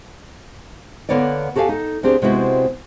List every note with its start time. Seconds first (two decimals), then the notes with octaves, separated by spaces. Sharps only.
1.09 D3 A#3 B3 C#5 D5
1.56 F#4 G4 A4 B4 F5 G#5
1.69 D#4 A4
2.03 D2 C4 D4 G4 G#4
2.22 C3 G#3 B3 C4 E4 F#4